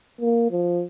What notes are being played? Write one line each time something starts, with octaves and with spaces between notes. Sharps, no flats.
A#3
F3